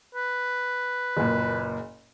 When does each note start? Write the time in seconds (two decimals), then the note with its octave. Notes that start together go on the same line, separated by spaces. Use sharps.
0.15 B4
1.17 F#1 A#2